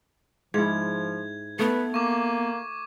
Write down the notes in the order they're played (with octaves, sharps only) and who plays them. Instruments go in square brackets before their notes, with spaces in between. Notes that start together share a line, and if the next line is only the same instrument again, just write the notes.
[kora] G#2 E4 [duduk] F3 [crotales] G#6
[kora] A3 [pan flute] B3 [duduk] B4
[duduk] A#3 [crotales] C#6 D6